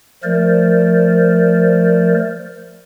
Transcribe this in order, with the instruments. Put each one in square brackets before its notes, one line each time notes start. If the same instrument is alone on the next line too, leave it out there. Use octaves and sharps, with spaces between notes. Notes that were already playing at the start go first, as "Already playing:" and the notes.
[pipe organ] F3 A3 A#4 C5 D5